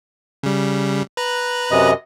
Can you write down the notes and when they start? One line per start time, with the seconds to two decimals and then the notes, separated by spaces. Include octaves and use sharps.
0.43 C#3 G3
1.17 B4 A#5 F#6
1.71 F#2 C3 D#5